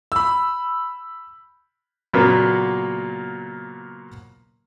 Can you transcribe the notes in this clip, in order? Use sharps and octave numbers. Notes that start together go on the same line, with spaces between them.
B5 E6
A#2 C#3 F#3 A#3 B3